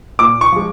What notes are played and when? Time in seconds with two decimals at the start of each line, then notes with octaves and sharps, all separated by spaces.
0.19 A#2 D6
0.41 C#6
0.52 F3 G#3